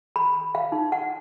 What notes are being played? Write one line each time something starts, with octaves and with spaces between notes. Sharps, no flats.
B5
F5
D#4
F#5